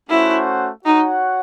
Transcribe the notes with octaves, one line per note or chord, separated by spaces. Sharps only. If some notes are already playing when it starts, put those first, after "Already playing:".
A3 C#4 E4 F#4 C5 F#5
D#4 F#4 C#5 F#5